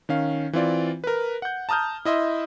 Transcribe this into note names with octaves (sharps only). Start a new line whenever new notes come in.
D#3 C#4 F5
E3 C4 F4 D5
A#4 B4
F#5 G6
A5 A#5 D#6 F6 G6
E4 D#5 E5 C6